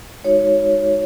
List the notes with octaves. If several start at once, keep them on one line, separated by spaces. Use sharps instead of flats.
G#3 D#4 F#4 C#5